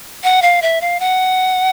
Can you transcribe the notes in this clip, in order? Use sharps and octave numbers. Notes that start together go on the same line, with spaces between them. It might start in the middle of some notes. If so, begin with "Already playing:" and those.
F#5
F5
E5
F5
F#5